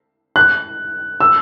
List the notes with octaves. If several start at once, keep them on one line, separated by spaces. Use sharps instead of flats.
F#6
E6